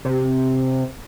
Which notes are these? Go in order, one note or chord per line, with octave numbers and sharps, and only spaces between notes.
C3